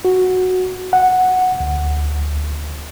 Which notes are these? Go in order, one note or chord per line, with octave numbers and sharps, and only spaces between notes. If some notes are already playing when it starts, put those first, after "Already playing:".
F#4
F#5
D2